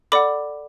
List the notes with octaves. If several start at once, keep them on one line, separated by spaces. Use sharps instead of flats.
A4 D5 F#5 B5 D6